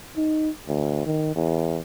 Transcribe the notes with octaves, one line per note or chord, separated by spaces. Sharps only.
D#4
D2
D#3
E2